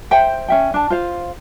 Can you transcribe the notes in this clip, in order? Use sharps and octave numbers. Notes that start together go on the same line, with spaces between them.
C5 E5 G5
C#4 E5 G5
D4 A5
F4 C5 F5